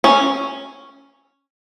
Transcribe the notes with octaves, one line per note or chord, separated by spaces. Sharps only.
C#4